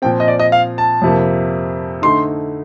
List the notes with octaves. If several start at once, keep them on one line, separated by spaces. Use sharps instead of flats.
A#2 F3 C4 G5
D#5
D5
D#5
F5
A5
F2 C3 F3 A#3
D3 A3 D#4 C6